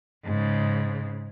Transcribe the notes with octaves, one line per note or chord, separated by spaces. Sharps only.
G#2 C#3